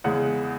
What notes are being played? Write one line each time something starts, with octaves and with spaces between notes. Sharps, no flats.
E2 C#3 G#3 F#5